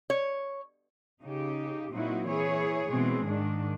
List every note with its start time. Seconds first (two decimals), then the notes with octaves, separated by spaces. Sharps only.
0.10 C#5
1.22 C#3 D#4 G4
1.91 A#2 F#3 C4 D#4 E4 F#4
2.28 E3 E4 G#4 C#5
2.91 B2 E3 G#3 C4 G#4
3.25 G#2 D#3 D4